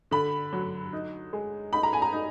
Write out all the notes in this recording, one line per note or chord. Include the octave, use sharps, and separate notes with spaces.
D3 B5
F#3
D#4
G#3
D#4 B5
A#5
G#5
A#5
D#4